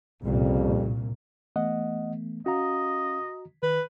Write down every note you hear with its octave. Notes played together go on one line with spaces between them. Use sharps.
C2 F2 A#2 C#3 G3
E3 A3 B3 D#5 F#5
C#4 F#4 D#5 F5 A#5
D#3 B4